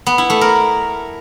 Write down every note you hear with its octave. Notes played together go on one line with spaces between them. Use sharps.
B3
E4
A3
A#4